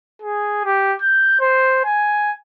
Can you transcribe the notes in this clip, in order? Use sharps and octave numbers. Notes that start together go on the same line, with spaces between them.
G#4
G4
G6
C5
G#5